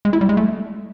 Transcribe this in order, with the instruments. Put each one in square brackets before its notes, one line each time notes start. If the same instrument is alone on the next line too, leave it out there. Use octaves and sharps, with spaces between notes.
[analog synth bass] G#3
E4
G3
G#3
A3